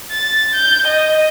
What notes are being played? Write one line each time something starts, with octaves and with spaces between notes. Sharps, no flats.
A6
G6
D#5